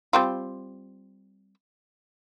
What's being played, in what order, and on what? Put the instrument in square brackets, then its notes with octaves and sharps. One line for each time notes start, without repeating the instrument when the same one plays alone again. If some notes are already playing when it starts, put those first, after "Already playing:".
[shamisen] G3 C4 F4